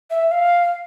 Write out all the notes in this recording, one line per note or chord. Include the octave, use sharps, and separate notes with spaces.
E5
F5